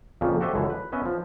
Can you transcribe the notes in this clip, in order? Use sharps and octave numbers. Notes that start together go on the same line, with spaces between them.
F2 A#2 C#3 F3
F#4 G4 A4 C5 D#5 E5
C#2 F#2 D3 E3
B4
B3 C#4 B4 D#5 E5
F3